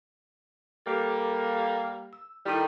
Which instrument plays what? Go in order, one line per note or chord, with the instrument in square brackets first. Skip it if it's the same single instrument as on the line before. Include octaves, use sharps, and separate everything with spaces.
[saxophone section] G3 A#3 [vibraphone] G4 A4
[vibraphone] E6
[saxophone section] D#3 G3 [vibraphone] E4 A4 G5